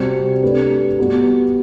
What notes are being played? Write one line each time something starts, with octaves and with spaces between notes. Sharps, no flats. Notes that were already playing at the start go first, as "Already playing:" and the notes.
Already playing: C3 G3 C4 F#4
A3 D4 G4 B4
G3 B3 F#4 B4